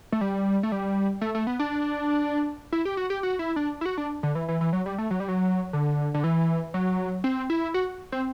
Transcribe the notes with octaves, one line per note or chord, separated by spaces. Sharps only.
A3
G3
A3
G3
A3
A3
B3
D4
E4
G4
F#4
G4
F#4
E4
D4
E4
F#4
D4
D3
E3
E3
E3
F#3
G3
A3
F#3
G3
F#3
D3
D3
E3
F#3
C4
E4
F#4
C4